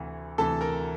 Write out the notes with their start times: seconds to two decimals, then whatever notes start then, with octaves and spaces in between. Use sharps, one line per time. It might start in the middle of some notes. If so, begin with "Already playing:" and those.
Already playing: D2 C3 E3
0.38 D2 C3 E3 A4 A5
0.61 A#4 A#5